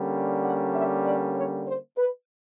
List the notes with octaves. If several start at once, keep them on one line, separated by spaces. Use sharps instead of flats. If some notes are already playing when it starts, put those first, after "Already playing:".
Already playing: D3 G3 A#3 C#4
F#5
E5
D5
C#5
C5
B4